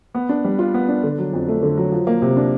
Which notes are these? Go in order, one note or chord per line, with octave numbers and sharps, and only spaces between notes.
B3
D4
G3
F4
B3
D4
D3
F#3
F2
A3
D3
F#3
F3
A#3
C3
D4